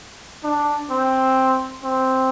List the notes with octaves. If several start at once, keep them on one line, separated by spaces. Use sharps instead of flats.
D4
C4
C4